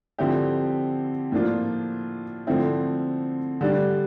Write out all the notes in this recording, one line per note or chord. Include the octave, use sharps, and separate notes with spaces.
D3 F3 C4 E4 G4
A2 F3 A#3 D4 F4
D3 F3 A3 C4 E4
D3 G3 D4